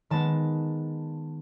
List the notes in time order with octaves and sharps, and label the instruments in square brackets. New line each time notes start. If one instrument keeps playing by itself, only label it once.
[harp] D#3 G#3 B3 A5